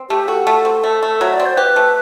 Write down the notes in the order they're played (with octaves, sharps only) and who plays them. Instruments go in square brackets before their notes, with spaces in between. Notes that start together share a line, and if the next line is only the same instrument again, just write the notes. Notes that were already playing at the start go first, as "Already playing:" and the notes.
Already playing: [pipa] C4
[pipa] A3 [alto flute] G4
[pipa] F#4 [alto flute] A4
[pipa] A3 [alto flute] A4
[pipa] C4
A3
A3
[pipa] F#3 [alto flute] E5
[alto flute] D5
[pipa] C4
[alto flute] C5
[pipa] G4 [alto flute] B4
[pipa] A3